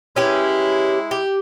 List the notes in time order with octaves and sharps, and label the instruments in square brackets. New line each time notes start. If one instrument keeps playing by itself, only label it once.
[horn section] G#3 E4 [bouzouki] C#4 G4 B4
[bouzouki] G4